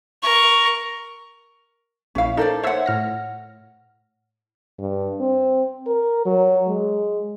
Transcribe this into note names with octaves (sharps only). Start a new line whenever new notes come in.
A#4 C#6
A#1 C#4 E4 F5
D#4 A4 A#4 C5 D5
C5 C#5 E5 F#5 E6
A2 F6 A#6
G2
C4
A#4
F#3
G#3